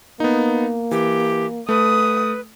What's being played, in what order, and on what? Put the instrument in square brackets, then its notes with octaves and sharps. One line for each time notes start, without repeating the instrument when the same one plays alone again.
[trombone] A#3 [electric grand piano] B3 D#4
[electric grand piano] E3 [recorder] G4
[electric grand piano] A3 [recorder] B4 [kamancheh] D#6